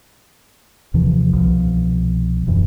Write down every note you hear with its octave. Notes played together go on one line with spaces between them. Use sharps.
D#2 C3 E3 F3
C2 B2 F3
D#1 F#2 E3